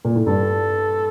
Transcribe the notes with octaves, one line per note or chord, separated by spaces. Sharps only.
A#2
A2
G2 A4